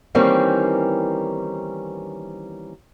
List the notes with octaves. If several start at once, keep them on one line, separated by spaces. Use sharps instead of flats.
D#3 E3 G3 A#3 C4 C#4